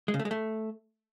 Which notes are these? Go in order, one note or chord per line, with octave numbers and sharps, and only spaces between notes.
G#3
C#3
A3
G#3
A3